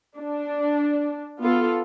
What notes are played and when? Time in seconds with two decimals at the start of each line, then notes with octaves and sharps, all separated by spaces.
0.17 D4
1.41 B3 F4 A4